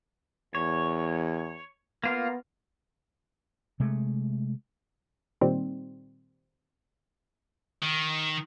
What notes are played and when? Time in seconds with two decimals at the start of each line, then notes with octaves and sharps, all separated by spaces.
0.55 E2 C#5
2.04 A#3 B3 F4 A#4
3.80 C3 G#3 A3
5.41 A#2 D#3 G3 C4
7.83 D#3